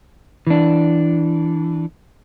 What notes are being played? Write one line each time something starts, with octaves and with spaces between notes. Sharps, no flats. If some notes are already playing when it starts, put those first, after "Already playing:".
E3 D4